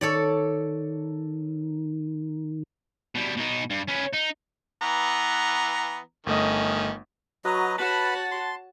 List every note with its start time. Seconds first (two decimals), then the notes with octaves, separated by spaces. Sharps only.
0.01 D#3 A4 C#5 D5
3.15 B2 G3
3.37 B2 D#4
3.70 G2
3.88 C#4 B4
4.13 D#4
4.81 E3 B3 A#5
6.26 G1 D#3 A3 C#4 D#5
7.45 F#3 F#4 B4 D#5 A#5
7.78 F#4 B4 C#5 F#5 A5 B5
8.31 C6